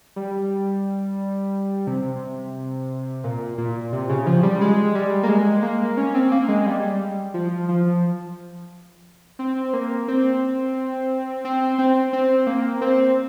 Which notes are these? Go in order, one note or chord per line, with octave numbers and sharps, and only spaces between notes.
G3
C3
A#2
A#2
C3
C#3
F3
G3
G#3
G3
A#3
G#3
A#3
C#4
C4
A#3
G#3
G3
F3
F3
C4
A#3
C4
C4
C4
C4
A#3
C4